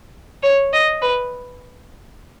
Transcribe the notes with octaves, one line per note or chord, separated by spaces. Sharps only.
C#5
D#5
B4